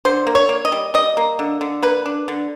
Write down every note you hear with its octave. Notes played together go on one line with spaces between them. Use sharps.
D3 C5
A#3
C#5
A#3
D#5
G3
G3 D#5
A#3
D3
D3
A#3 B4
D4
D3